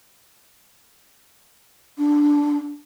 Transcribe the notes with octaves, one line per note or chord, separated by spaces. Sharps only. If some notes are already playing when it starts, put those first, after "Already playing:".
D4